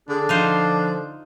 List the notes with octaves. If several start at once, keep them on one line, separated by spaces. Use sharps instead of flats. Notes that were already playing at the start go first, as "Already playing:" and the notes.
D3 D4 G#4
F3 D#4 F4 C5